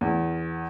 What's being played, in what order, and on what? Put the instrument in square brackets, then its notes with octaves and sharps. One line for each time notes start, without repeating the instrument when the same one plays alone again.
[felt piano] E2